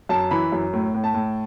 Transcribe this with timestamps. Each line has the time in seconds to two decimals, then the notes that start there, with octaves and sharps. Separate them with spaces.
0.09 F#2 A5
0.31 E3 B5
0.52 F#2
0.73 A2
0.94 A2
1.04 A5
1.14 A2